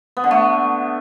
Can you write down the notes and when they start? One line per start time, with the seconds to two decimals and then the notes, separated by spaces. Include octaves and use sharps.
0.17 B3
0.24 D3
0.31 A3